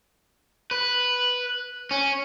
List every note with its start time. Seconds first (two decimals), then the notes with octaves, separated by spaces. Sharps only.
0.71 B4
1.91 C#4